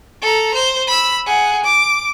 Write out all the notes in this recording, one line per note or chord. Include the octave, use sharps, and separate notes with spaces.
A4 A#5
C5
B5 E6
G#4 F#5
D6